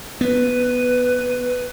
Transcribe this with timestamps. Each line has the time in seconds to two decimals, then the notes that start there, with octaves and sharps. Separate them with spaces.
0.21 B3 B4